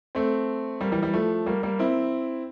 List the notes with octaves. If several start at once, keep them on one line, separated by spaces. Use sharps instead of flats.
A3 C4
G3 A#3
E3 G3
E3 G3
F3 A3
G3 A#3
G3 A#3
C4 E4